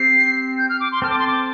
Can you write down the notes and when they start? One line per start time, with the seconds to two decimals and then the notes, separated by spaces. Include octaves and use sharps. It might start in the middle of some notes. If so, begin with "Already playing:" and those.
Already playing: C4 G4 C5 C7
0.58 G6
0.69 F6
0.80 D6
0.92 C6
1.02 C4 A4 C5 F6
1.10 D6
1.19 C6
1.27 D6